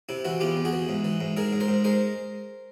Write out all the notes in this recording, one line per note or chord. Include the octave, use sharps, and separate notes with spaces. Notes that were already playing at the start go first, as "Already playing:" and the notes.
C3 E4
E3 E4 F#4
E2 F4 G4
E2
F#4 G#4
E3
G#2
E3
G#2
G#2 G#4 A#4
G#2
A#4 C5
G#2
G#3 A#4 C5